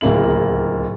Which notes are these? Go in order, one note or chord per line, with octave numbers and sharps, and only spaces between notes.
D1 C#2 A#3 E4 F#7